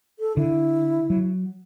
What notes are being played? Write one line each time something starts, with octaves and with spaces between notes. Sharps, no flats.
A4
D3 E4
F#3